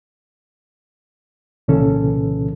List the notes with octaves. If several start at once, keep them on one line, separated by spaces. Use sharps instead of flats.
C2 A#2 C#3 E3 C#4 A4